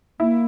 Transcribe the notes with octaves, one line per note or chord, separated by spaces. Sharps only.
A#3 E4